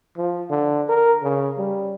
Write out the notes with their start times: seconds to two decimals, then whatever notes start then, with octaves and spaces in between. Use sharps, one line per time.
0.17 F3
0.50 D3
0.89 A#4
1.22 C#3
1.58 G3